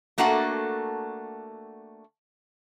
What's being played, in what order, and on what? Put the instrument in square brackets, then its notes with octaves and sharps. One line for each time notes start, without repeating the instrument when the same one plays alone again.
[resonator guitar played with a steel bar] A3 A#3 D4 F#4 A4 F#5